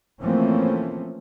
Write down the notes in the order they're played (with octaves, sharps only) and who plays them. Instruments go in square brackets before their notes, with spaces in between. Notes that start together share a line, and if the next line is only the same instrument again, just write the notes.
[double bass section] E3 F3 A3 A#3 C4 C#4